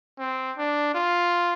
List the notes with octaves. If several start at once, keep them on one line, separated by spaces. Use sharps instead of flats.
C4
D4
F4